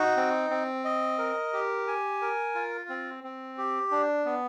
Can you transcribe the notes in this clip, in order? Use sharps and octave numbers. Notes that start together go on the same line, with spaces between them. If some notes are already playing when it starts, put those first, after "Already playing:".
Already playing: D#4 F#4
C4
C4
D#5
A#4
G4
G#5
A#4
F4
C4
C4
G4
D4
B3